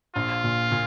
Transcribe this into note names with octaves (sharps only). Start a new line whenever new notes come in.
A#1 F4
A#2
A#2